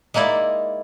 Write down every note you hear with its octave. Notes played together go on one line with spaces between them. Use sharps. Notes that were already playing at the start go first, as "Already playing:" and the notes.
G#3 A#3 D#4 E4 D5